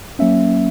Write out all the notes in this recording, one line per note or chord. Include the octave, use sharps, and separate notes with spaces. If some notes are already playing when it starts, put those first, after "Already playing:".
F#3 A#3 C#4 E5